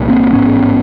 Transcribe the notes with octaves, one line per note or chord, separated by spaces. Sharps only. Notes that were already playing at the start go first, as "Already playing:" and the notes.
Already playing: C2 A#2
A#3 C4
A1 G#2 B3 C#4